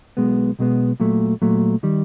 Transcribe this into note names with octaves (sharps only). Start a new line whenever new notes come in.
B1 B2 G#3 B3
B1 B2 G#3 B3
A#2 F#3 A3
A#2 F#3 A3
D#3 G3